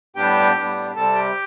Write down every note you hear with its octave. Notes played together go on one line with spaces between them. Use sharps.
A2 G3 B3 D4 G4 G5
A2 G3 B3 D4
C3 G3 C4 A4 A5
G4 G5